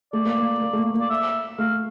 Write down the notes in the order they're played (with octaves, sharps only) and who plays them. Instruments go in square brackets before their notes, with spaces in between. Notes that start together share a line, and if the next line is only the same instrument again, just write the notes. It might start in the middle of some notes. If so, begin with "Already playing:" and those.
[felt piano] A3 [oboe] D5
[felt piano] A#3
A#3
A#3
A3
A#3
A#3
[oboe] D5
E5
[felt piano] A3 [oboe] F5